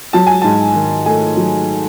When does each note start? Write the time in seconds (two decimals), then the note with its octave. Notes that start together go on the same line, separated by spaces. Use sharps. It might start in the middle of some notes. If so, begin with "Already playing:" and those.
0.13 F#3 A5
0.27 G#5
0.41 G#2 A5
0.75 D#3
1.06 A3 G#5
1.37 F#3